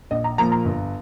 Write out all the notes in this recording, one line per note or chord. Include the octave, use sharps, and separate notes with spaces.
A#1 D#5
A#5
A#2 F3 A#3 A#5
A#5
G1